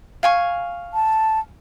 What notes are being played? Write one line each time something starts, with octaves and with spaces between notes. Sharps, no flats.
F5 G#5 C#6
A5